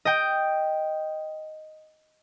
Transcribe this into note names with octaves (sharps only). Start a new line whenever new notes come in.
D#5 G5